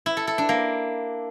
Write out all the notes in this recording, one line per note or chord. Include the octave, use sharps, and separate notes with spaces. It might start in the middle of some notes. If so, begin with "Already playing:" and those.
E4
A4
A4
D4
A#3